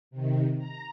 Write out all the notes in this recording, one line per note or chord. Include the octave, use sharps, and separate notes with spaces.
C3 D#3
A#5